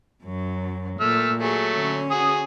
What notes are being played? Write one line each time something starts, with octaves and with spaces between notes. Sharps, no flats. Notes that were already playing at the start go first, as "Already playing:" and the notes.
F#2 F#3
A#2 A3 E6 F6
F#3 A3 G#4
D3 C#4
F#4 G#4 D#6